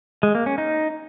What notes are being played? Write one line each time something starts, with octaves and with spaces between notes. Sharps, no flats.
G#3
A#3
C#4
D#4